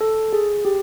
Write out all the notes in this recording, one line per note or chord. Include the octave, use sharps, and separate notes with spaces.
A4
G#4
G4